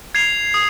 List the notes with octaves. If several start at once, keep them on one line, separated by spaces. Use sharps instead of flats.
G#6 C7 F7
D#6